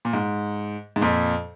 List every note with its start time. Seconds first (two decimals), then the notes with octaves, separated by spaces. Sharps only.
0.05 A#2
0.13 G#2
0.96 G#2
1.01 F2 A#2